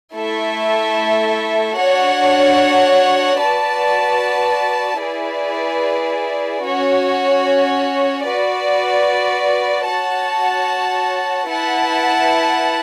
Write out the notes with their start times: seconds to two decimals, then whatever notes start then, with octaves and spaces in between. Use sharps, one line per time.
0.15 A3 E4 A4 E5
1.77 D4 F#4 C#5 F#5
3.39 F#4 B4 D5 A5
5.00 E4 G#4 B4 D5
6.62 C#4 F#4 C#5
8.24 F#4 B4 D5
9.86 F#4 C#5 F#5 A5
11.49 E4 B4 F#5 A5